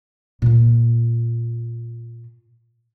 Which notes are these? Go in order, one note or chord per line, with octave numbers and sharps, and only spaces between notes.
A#2 F4